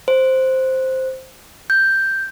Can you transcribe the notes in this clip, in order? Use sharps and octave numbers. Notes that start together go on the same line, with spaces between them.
C5
G6